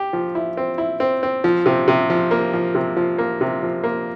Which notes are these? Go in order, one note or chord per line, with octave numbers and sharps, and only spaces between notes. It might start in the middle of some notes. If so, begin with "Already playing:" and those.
Already playing: G4
F3
E4
C4
E4
C4
C4
F3
C3
C3
F3
A#3
F3
C3
F3
A#3
C3
F3
A#3